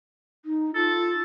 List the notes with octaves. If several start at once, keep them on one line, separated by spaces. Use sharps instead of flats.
D#4
F4 A4